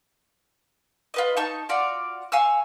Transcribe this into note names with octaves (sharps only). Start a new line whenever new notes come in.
F4 B4 D#5
D#4 A5 C#6
F4 F#4 D5 F5
F5 G#5 C#6 E6